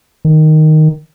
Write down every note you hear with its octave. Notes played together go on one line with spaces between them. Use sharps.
D#3